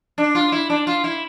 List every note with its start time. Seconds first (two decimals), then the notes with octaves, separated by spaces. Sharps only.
0.18 D4
0.35 F4
0.52 E4
0.70 D4
0.87 F4
1.04 E4